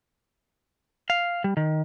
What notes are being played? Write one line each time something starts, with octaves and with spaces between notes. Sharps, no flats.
F5
G3
D#3